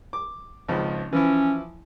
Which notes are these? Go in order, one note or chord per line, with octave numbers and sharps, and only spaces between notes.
D6
G#1 C#2 F3
E3 F3 C#4 E4